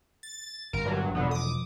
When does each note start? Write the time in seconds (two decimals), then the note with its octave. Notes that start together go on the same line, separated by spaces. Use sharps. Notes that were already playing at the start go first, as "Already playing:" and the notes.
0.23 A6
0.73 G1 A#4
0.85 G2 A#2 F#3
1.15 E1 D3 F3 B3
1.31 D6 D#6